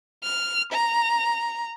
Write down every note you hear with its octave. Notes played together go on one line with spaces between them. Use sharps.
F6
A#5